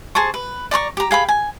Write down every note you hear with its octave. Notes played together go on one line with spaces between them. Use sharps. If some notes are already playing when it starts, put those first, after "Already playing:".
G#4 C5 A5 C#6
B4
D5 A#5 C6 C#6
G4 A#5
G#4 F5 G5 B5
G#5